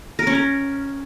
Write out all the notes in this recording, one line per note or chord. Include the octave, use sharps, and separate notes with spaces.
A#4
C#4
A#4